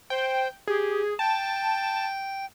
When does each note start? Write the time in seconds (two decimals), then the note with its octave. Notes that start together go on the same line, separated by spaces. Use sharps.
0.10 C5 G5
0.67 G4 G#4
1.19 G5 A5